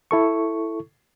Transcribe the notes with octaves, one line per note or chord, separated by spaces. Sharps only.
E4 A4 C#6